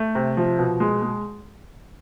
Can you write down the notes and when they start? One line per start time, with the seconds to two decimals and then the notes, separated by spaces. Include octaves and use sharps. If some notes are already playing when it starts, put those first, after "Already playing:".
Already playing: A3
0.15 C3
0.37 F3
0.59 B2
0.80 G#3
1.02 G#3